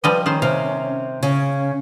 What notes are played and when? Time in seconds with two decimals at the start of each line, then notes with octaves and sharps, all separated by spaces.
0.04 F3 G3 B4 D#5
0.26 D#3 C#4 C5
0.42 C3 F5
1.23 C#3 C#4